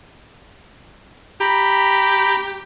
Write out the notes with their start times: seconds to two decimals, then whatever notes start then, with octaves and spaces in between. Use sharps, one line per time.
1.41 G4 A#5 B5